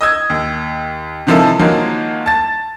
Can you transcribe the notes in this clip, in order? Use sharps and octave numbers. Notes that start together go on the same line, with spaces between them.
D#5 D#6 E6 G#6
D#2
C3 D#3 F3 G#3 E4 A4
D#3 F3 F#3 G#3 A#3
A5 A6